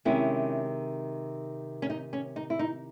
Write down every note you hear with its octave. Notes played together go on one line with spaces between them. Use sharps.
C3 D#3 G#3 C#4 E4
C#4
D#4
C#4
D#4
E4
D#4